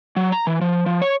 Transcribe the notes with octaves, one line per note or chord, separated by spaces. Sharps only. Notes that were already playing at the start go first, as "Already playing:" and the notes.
F#3
A#5
E3
F3
F3
C#5